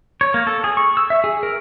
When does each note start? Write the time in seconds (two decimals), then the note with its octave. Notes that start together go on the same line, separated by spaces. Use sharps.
0.21 C#5
0.34 A#3
0.47 A4
0.64 G#4
0.77 C#6
0.97 E6
1.10 E5
1.24 G#4
1.43 A#4